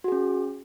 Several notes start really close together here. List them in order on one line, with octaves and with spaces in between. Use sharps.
F#4 G#4 C#4